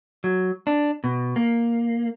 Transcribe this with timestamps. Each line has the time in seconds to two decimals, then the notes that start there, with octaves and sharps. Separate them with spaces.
0.24 F#3
0.67 D4
1.04 B2
1.36 A#3